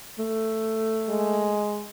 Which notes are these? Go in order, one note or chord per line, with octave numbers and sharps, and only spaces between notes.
A3
G#3